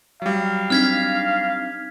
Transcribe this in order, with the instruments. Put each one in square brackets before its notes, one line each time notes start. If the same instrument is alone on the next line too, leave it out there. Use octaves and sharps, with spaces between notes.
[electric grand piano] F#3 G3 [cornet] F5
[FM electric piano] C4 D4 D#4 [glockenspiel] F6 G#6 B6